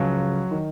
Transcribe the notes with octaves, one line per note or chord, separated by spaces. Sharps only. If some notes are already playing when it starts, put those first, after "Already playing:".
Already playing: C#2 C#3 F3 F#3
D#3